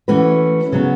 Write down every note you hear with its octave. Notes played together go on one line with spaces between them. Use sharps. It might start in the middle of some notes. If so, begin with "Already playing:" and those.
E3 A3 C#4 F#4 B4
C#3 F#3 B3